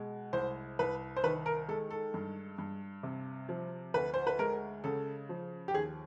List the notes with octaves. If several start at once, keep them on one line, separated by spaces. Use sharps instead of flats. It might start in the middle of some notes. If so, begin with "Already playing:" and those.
Already playing: B2 G#3
C2 C5
C2 B4
C5
D#3 B4
A#4
G#3 A4
A4
G2
G2
C3
F3
D2 B4
C5
B4
G#3 A#4
C#3 A4
F3
G4
D#2 G#4